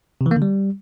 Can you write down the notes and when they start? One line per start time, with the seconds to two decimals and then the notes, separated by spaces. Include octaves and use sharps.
0.21 C3
0.26 E3
0.31 A#3
0.37 D3
0.42 G3